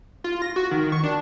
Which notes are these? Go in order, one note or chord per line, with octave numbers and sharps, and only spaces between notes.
F4
A#6
F#4
D#3
C#6
D4